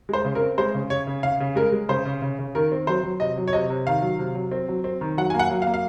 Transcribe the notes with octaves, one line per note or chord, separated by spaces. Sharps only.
G#3 C5
C#3
A#4
C4
G#3 C5
C#3
C#3 C#5
C#3
C#3 F5
C#3
G#3 A#4
G#3
C#3 C5
C#3
C#3
C#3
D#3 A#4
C4
F#3 C5
F#3
C3 D#5
F#3
C#5
C3 D#5
C3
D#3 F5
F#3
C3
F#3
C4
F#3
C4
D#3
F#3 F#5
A#3 G#5
F#5
F#3
F5
A#3
F5